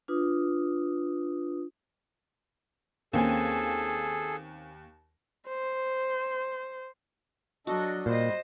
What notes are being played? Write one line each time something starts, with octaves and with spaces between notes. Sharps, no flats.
D4 F4 B4 D#6
D#2 A#3 C4 C#4 G#4 A4 G#5
C5
F#3 D4 F#4 A4 D#5
A#2 G3 C5 D#5